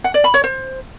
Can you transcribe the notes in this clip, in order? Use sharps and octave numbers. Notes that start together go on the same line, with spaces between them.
F#5
D5
B5
C#5
C5